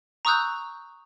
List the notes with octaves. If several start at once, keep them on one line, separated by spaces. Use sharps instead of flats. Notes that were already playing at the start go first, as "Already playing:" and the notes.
A#5 C#6 D#6 E6 F#6 G6